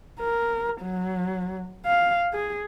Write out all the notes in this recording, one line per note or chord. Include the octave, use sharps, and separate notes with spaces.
A#4
F#3
F5
G#4